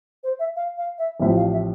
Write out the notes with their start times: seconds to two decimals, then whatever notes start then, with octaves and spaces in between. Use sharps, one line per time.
0.23 C5
0.39 E5
0.56 F5
0.77 F5
0.98 E5
1.20 A1 A2 F3 C4 E5
1.36 F5
1.52 E5